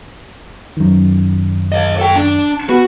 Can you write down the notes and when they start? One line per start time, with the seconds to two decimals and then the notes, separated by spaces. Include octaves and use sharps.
0.77 F#2 D#3
1.72 C#5 D#5
1.99 A4 G5
2.16 D4
2.69 B3 F#4 B5